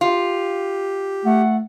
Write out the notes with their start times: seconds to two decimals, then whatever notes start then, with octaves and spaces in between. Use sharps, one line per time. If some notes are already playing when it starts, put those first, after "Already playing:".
0.01 F4 G4
1.25 A3 F#5